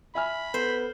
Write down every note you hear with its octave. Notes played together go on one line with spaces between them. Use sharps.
E5 G#5 B5 F6
B3 A4 C5